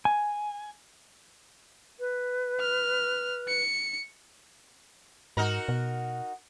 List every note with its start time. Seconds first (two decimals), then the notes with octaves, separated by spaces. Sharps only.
0.05 G#5
2.00 B4
2.60 F6
3.48 C#7
5.37 G#2 D#4 F#4 A#4
5.68 B2